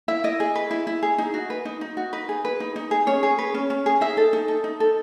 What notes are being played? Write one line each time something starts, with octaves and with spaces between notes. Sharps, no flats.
E4 E5
E4 D#5
G#4
B4
E4
E4
G#4
D#4
F#4
B4
D#4
D#4
F#4
D#4 B4
G#4
B4
D#4
D#4
G#4
C#4 C#5
G#4
B4
C#4
C#4
G#4
D#4 E5
A4
D#4
A4
D#4
A4